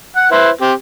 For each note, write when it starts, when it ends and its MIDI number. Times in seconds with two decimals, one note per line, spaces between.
0.16 0.31 78
0.31 0.49 64
0.31 0.49 71
0.31 0.49 72
0.61 0.72 60
0.61 0.72 67